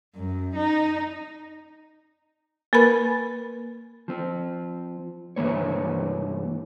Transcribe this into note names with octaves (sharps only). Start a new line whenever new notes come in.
F#2
D#4
A#3 A#4 B4 B5 A6
F3 C4
C2 G2 E3 G#3 A#3 C#5